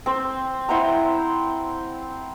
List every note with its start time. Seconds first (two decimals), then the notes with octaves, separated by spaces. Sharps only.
0.06 C4 C5
0.69 E4 C5 F#5 A#5